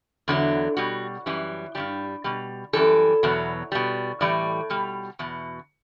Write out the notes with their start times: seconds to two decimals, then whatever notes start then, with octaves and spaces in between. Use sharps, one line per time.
0.28 E2 D3 F#3
0.77 B2 G3 F#4
1.26 F#2 E3 G3
1.75 G2 E3 G3 G4
2.24 B2 G3
2.73 F#2 E3 G3 A4
3.23 E2 B2 F#3
3.72 B2 G3
4.21 A2 E3 G3 D5
4.70 B2 G3
5.19 E2 B2